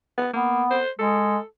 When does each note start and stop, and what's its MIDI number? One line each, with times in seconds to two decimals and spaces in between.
0.18 0.31 59
0.33 0.63 58
0.33 0.79 59
0.70 0.90 72
0.99 1.37 56
0.99 1.45 69